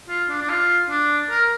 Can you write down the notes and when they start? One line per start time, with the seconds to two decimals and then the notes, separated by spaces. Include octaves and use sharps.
0.09 F4
0.30 D4
0.41 D4
0.49 F4
0.90 D4
1.30 A#4